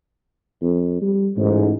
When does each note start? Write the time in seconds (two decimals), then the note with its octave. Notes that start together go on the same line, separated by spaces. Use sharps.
0.62 F2
1.02 G3
1.38 A1 G#2